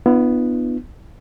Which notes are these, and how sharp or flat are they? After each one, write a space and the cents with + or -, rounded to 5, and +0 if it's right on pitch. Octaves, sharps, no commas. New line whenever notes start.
B3 +0 D4 +35 F4 -45